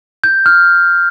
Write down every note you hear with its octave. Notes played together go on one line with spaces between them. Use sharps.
G6
F6